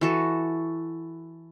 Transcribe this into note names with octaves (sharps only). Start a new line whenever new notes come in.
E3 F#4 A4